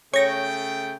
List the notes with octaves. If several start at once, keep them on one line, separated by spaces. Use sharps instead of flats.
C#3 A3 C#5 G5 A#6